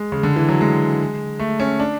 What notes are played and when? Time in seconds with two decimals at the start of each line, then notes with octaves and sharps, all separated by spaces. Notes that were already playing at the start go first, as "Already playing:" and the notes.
Already playing: G#3
0.12 C#3
0.23 D3
0.36 E3
0.49 F#3
0.61 G#3
1.39 A3
1.60 C#4
1.80 D4